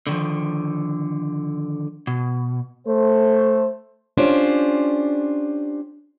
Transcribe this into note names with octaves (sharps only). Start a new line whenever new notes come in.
D3 D#3 F3
B2
A3 C5
C#4 D4 F4 G4 C5